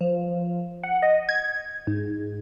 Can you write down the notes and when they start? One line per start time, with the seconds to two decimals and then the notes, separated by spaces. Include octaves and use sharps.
0.01 F3
0.83 F#5
1.02 D#5
1.29 G#6
1.87 G#2